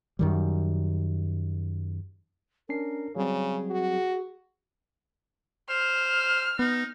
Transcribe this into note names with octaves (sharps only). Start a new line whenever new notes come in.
F#2 D#3 G3
C#4 D4 A#4 C7
C#3 F#3 G3 C4 G#4
F#4
C5 F6
B3 D#4